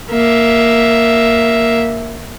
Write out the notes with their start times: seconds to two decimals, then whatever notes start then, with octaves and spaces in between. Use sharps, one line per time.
0.11 A#3 E5